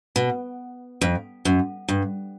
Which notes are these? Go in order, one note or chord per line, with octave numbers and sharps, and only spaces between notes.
B2
F2
F#2
G2